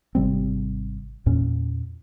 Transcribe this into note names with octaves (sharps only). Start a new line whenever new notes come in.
G#1 C3 G3 C4
E2 A#2 C#4